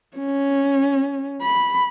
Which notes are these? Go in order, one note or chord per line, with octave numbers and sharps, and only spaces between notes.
C#4
B5